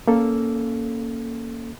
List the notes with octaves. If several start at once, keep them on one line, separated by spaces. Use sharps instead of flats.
A#3 C#4 A4